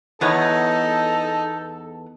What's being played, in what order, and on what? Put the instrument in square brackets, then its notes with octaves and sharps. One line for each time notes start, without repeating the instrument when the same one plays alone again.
[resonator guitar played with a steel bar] E2 B3 C#5 [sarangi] D#4 [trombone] A4